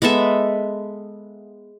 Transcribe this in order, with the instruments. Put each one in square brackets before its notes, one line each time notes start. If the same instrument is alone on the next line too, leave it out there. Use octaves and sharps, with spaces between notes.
[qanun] G#3 B3 A4 E5